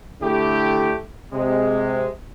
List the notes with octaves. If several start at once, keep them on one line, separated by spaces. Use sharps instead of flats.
D3 A3 E4 G4
C3 G#3